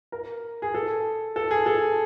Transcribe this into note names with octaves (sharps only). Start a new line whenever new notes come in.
A#4
G#4
A4
A4
G#4
A4